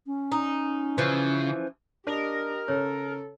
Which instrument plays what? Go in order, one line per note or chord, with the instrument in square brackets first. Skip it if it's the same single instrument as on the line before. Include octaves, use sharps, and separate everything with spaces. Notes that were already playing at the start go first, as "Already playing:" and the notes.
[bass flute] C#4
[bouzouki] D#4
[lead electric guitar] C#3 [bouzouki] E3 F3
[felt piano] D4 [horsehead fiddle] G4 D#5 [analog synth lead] A#4
[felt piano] C#3 [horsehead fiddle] A4 [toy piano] C#5